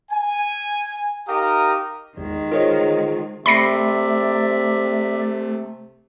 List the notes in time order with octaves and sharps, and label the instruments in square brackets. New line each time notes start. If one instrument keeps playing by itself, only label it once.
[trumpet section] G#5
D#4 G4 A#4 F5 A#5 D#6
[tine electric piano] A1 E2 [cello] D#3 G#3
[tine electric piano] F4 G#4 C5 [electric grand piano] A#4 C#5 D#5
[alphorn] C3 [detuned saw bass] A3 [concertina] D5 E5 [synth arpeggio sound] B5 A#6 C7